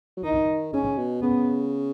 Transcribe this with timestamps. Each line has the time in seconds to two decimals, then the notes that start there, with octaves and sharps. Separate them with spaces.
0.17 F#3
0.24 D#3 D#4
0.73 C#3 C#4
0.98 B2
1.22 C#3 B3